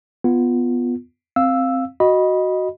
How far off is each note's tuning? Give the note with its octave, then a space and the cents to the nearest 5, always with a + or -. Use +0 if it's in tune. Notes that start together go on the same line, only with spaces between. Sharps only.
B3 +0 F4 +0
C4 +0 F5 +0 E6 +0
F#4 +0 D#5 +0 B5 -15